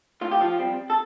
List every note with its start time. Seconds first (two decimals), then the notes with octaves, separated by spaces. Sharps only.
0.21 A2 F4
0.31 G4
0.41 F3 F4
0.59 G3 C4
0.90 A4